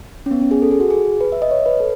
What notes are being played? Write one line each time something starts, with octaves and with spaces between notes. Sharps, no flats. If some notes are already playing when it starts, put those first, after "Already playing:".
C#4
B3
C#4
G#4
A4
G#4
F#4
G#4
B4
E5
D#5
C#5
B4
A4